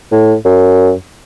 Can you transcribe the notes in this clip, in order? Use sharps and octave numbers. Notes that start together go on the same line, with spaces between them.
A2
F#2